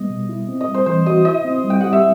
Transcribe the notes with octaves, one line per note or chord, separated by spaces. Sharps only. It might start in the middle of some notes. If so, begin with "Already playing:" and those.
Already playing: G3 B3 D#5
B2
E4
C4
D#5
G3
C5
E3 C5
F#4 D#5
E4 D#5
C4
G3
G5
G4 F#5
E5